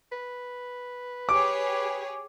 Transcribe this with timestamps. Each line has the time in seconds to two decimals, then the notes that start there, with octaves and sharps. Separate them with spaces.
0.12 B4
1.29 G4 G#4 C#5 D6